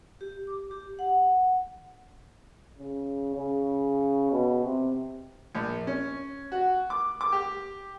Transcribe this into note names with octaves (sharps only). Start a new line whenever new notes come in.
G4
D6
G4
F#5
C#3
C#3
B2
C3
A#1
C#4
F#4
D6
D6
G4